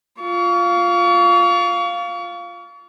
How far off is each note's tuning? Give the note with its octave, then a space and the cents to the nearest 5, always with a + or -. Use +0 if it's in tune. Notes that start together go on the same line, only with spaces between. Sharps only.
F4 +0 C#6 +35